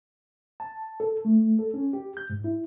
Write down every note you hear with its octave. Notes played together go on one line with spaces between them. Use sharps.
A5
A4
A3
A4
C#4
G4
G6
G#2
E4